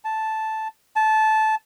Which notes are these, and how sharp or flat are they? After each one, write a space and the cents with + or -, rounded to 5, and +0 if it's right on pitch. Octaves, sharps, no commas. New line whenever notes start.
A5 -5
A5 -15